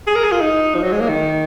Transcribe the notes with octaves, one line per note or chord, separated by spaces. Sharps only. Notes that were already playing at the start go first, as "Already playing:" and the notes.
G#4
A#4
G#4
F4
D#4
F3
F#3
G#3
A#3
D#3